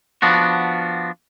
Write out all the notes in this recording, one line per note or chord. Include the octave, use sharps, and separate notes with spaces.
F3 B3 D4 F#4